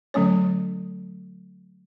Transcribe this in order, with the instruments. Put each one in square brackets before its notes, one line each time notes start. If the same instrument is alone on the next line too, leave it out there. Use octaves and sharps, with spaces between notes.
[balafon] D3 F#3 A3 C#4 C#5